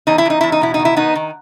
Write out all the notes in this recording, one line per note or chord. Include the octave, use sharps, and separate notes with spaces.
E2 D#4
E4
E2 D#4
E2 E4
D#4
B2 E4
D#4
D#3
E4
D#3 B3 D#4
D#3